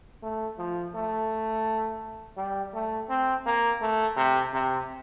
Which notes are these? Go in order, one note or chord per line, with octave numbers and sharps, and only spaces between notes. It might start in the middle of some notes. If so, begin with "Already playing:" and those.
A3
F3
A3
G3
A3
C4
A#3
A3
C3
C3